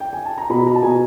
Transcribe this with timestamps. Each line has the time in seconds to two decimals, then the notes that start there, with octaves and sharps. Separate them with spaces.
0.00 G5
0.13 G#5
0.25 A5
0.38 A#5
0.50 B2 B5
0.67 A#5
0.75 A5
0.82 B2 G#5